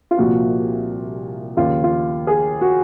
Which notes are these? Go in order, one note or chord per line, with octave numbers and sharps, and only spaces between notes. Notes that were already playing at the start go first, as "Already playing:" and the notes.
F4
C2 A#2 F3 F#4
D#2 C#3 F3 F4
F4
G#4
F#4